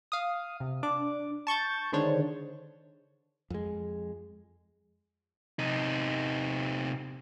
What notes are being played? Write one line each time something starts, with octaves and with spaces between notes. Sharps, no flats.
F5 D#6
C3
D4 D6
A5 C#6 G6 A6
D3 D#3 G#3 D4 C5 C#5
F2 G#3
C3 D#4